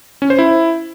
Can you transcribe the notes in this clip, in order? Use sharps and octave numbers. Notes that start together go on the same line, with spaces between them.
C#4
C5
E4